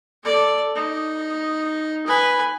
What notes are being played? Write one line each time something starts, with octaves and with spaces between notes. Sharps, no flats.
A4 D5
D#4
B4 G#5